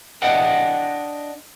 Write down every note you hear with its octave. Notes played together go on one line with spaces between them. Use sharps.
D4 D#5 F#5 G5